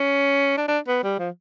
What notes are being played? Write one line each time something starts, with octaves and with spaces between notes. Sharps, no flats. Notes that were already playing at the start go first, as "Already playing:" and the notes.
Already playing: C#4
D4
D4
B3
G3
F3